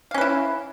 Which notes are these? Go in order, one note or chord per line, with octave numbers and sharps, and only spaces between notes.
C#4 E4 B4 F5